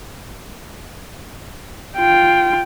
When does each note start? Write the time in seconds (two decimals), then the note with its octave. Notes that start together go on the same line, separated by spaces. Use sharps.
1.97 F4 G5